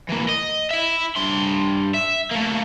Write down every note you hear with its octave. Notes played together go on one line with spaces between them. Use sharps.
E3 A#3
D#5
E4 E5
G2 C6
E5
A3 A#3